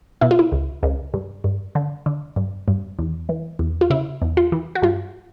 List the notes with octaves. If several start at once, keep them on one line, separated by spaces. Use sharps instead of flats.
B2 E4
F4
E4
C#2
C#2
G2
G2
D3
D3
G2
G2
E2
E3
E2
F4
C#3 E4
E2
F4
E3
F#4
G2 F4